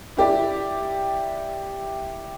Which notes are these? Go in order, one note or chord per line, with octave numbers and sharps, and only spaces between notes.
E4 G4 D5